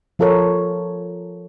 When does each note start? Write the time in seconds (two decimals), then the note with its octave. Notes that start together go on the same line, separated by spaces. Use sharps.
0.19 F3 F4 A4 A#4 C#5